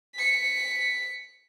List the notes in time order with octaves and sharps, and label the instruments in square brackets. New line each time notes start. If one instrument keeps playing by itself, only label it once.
[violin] B6 C#7